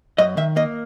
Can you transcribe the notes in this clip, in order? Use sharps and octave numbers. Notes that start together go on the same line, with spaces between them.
F#2 D#5
D#3 E5
A#3 D#5